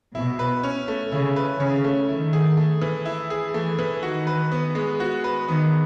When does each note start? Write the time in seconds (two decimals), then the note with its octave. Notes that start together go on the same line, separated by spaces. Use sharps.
0.15 B2 E4
0.39 B4
0.63 C#4
0.88 A3
1.12 C#3 E4
1.36 B4
1.60 C#3 C#4
1.84 A3
2.08 D#3 E4
2.33 G#4
2.57 A3
2.81 E3
3.05 E4
3.30 G#4
3.54 E3 A3
3.79 E3
4.03 D#3 F#4
4.27 B4
4.52 B3
4.75 G#3
5.00 F#4
5.24 B4
5.48 D#3 B3